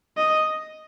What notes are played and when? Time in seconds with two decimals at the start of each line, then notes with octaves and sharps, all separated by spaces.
0.17 D#5